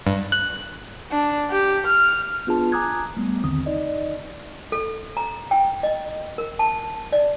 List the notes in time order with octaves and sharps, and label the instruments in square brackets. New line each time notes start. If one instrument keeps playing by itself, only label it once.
[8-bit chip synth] G2
F#6
[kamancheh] D4
G4
F6
[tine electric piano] B3 D4 F4 G#4 B4 A5
G#5 A#5 D6 D#6 F#6 G#6
G3 A3 B3
A#1 D#2 D3 D#3 C4 D#6
D#4 D5 D#5
[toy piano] A4
A#5
G5
D#5
A#4
A5
D5